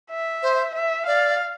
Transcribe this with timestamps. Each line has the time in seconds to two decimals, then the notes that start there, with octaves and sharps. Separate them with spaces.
0.11 E5
0.43 C5
0.75 E5
1.06 D5 F5